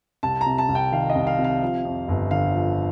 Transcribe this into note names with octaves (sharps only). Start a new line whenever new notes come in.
C2 A5
A#5
C3
A5
C2
G5
D#3 F5
D#5
C2
F5
C3
F5
F3
F2
G1
D3 F5
F3